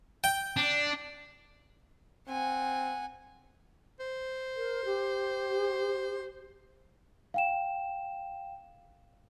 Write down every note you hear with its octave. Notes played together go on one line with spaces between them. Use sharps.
G5
D4
C4 F#5 G#5
C5
A#4
G4
F5 G5 E7